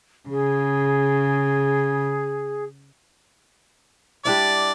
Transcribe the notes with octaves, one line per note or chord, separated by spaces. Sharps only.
C#3 G#4
G3 D4 E4 D5